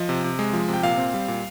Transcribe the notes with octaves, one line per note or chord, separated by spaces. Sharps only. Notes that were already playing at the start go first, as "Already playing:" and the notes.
Already playing: F3 D#5
C3
C3
G#3
F3
C3
G5
A#2 F5
C4
G3
A#2